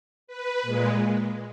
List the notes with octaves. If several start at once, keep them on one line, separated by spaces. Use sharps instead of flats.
B4
A#2 G#3